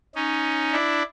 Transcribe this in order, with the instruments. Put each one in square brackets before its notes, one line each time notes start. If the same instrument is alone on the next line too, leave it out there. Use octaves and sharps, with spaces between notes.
[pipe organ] C#4 D#4
D4 E4